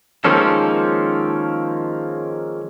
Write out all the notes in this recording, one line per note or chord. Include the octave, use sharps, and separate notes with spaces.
D#3 F3 G#3 A#3 C#4 A4